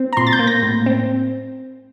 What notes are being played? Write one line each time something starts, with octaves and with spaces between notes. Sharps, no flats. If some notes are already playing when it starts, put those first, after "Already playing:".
Already playing: C4
A#5
A#2 C6
A6
G6
A#3
A#6
A2
C4